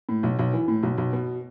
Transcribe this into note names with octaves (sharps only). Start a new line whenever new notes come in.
A2
B1
B1
E3
A2
B1
B1
B2